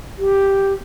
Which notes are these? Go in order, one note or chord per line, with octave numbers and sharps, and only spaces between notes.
G4